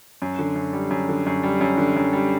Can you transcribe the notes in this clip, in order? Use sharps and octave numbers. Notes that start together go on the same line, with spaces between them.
F#2
D3
F#2
G3
F#2
D3
F#2
G3
F#2
D3
F#2
G3